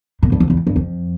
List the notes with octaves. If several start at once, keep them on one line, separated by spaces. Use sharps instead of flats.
A#2
G2
F2
E2
G2
F2